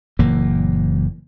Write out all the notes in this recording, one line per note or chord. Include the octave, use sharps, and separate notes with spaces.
F#1 A#2 E3 A#3